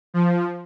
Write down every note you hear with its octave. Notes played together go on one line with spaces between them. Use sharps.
F3